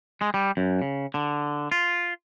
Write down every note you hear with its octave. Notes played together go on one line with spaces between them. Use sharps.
G#3
G3
F#2
C#3
D3
F4